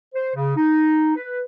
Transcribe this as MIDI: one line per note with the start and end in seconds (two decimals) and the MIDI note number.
0.15 0.31 72
0.36 0.57 49
0.57 1.14 63
1.17 1.42 71